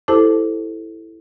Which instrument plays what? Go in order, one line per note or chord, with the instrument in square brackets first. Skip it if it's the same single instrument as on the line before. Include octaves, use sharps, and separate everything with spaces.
[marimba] E4 G4 A4 C5 A5 D6